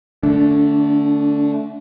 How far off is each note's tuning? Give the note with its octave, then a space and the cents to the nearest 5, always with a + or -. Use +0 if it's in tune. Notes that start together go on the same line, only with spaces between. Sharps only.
D3 +0 A3 +0 D4 -35